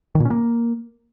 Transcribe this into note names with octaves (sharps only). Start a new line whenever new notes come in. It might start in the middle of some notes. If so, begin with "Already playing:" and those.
D#3
A#2
C#4
A#3